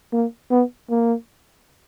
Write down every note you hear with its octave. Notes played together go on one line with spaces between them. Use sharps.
A#3
B3
A#3